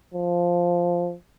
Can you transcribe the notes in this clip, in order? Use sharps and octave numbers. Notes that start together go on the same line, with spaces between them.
F3